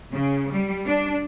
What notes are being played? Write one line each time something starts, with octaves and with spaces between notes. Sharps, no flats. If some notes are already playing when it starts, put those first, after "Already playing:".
C#3
G3
D4